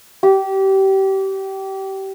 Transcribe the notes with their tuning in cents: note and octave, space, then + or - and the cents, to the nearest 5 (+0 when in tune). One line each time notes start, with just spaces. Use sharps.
G4 -25